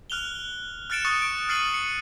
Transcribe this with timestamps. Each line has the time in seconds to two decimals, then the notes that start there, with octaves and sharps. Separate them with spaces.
0.10 F6 F#6 F7 G7
0.90 F6 F#6 A6 C#7 D7 E7
1.05 C#6 D#6 F#6 A6 C#7
1.22 D7
1.49 F6 A6 C7 C#7 D#7 F#7
1.74 C#7